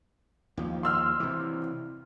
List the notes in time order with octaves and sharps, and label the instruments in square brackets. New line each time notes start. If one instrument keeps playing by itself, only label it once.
[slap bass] D#2 F3
[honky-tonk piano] C6 E6 F6
[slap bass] C3 E3